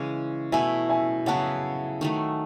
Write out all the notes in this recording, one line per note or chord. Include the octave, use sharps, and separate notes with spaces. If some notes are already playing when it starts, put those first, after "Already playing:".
Already playing: C#3 E3 G#3 C#4
B2 A3 E4 E5 G#5
E5 G#5
C#3 F#3 B3 E4 F#5 A5
D#3 F#3 A3